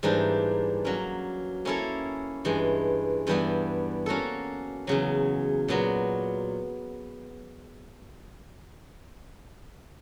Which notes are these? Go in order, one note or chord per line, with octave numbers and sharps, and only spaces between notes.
G#2 E3 G3 A#3 D4
F#3 A#3 C#4
A#3 C#4 E4 A4 C#5
G2 E3 G#3
G2 E3 G3 B3
A#3 C#4 F#4 A4
E2 C#3 F#3
A#2 F#3 B3